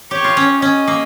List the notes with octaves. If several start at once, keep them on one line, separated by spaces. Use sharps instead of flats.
G4 C#5
F4
C#4
C#4 D#5
A#3